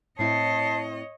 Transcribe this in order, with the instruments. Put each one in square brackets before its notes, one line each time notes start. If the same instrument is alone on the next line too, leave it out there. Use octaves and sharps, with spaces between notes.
[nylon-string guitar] A2 C4 E4 [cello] C#5 D#5 [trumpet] A5 [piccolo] C7